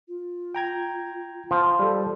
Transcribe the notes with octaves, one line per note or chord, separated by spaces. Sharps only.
F4
G5 A#5 G#6
F3
G3 A4